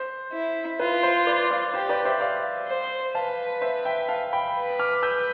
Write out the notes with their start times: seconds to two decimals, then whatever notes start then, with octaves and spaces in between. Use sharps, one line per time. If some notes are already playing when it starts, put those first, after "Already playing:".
Already playing: C5
0.32 E4
0.80 F4 B4
1.03 C5
1.27 B4 D5
1.50 D5 F5
1.73 G4 C5
1.89 B4 D5
2.05 C5 E5
2.21 D5 F5
2.68 C5
3.15 B4 F5 A5
3.61 C5 E5
3.85 E5 G5
4.09 F5 A5
4.33 G5 B5
4.56 B4
4.79 D6 F6
5.03 E6 G6